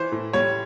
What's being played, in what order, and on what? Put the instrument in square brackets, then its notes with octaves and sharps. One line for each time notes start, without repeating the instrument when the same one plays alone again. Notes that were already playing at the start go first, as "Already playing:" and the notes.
Already playing: [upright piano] E3 C5
A2
G3 C#5